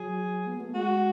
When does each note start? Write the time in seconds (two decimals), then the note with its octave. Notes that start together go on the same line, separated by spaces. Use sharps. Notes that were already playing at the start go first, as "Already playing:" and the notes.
Already playing: F#3 G#4
0.47 B3
0.60 A3
0.74 G#3 F#4